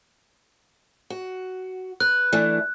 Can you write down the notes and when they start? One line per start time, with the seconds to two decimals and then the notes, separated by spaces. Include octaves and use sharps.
1.10 F#4
2.00 B4 F#6
2.33 E3 A3 D4